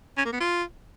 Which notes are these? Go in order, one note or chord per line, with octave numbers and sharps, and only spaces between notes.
C#4
A#3
B3
F4